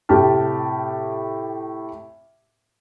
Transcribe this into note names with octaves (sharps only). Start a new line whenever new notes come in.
A2 C3 G4 A5 F6